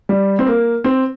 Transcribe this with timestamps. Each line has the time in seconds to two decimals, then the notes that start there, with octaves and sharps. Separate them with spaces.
0.09 G3
0.39 C4
0.47 A#3
0.84 C4